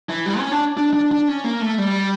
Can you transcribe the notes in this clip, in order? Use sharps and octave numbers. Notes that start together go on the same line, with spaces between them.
E3
G3
C#4
D4
D4
D4
D4
C#4
A#3
A3
G3